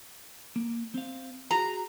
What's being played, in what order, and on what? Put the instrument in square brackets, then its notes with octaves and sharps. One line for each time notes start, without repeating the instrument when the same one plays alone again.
[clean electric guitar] A#3
C4 F5
[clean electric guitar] F#4 G#4 [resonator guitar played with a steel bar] A#5